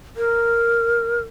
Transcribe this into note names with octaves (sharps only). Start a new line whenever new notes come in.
A#4